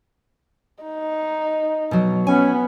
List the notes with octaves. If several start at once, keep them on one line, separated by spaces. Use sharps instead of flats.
D#4
B2 F#3
B3 C#4 G#5